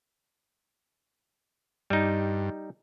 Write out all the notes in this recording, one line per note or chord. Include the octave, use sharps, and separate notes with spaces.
G2 G3 D#4